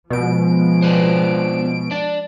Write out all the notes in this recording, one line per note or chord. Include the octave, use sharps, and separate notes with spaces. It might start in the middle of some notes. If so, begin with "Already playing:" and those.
B2 F3 G#3 D7
D4 B4 C5
D4 D5